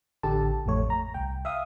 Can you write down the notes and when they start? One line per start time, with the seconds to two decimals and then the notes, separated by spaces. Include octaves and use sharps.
0.23 A1 D3 G4 A4 A5
0.66 A1 F2 A3 C#5
0.90 A#5
1.14 C2 G5
1.45 E5 F5 D#6